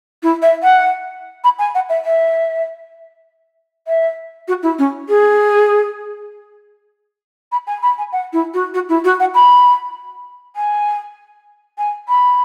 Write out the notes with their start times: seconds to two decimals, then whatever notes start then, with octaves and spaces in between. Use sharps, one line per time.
0.23 E4
0.42 E5
0.63 F#5
1.44 B5
1.59 G#5
1.75 F#5
1.89 E5
2.05 E5
3.88 E5
4.48 F#4
4.63 E4
4.79 C#4
5.09 G#4
7.52 B5
7.67 G#5
7.83 B5
7.98 G#5
8.13 F#5
8.33 E4
8.54 F#4
8.74 F#4
8.89 E4
9.04 F#4
9.20 F#5
9.35 B5
10.56 G#5
11.78 G#5
12.08 B5